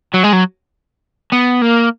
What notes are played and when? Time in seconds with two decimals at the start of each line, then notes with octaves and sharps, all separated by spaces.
0.14 F#3
0.24 G#3
0.33 F#3
1.32 B3
1.62 A#3